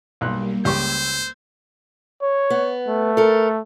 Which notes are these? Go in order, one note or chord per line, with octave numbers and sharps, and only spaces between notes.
B1 G3 A#3 F#6
C#2 G4 C5 C#6 E6 G#6
C#5
B3
A3
A4 A#4